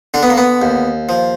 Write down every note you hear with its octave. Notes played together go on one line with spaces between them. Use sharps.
D3 D4
B3
A#3
B3
D#2
F3